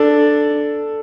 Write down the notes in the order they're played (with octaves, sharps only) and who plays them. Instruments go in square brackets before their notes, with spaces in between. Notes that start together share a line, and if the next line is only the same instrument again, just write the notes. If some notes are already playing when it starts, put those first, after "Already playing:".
Already playing: [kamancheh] D4 [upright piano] A4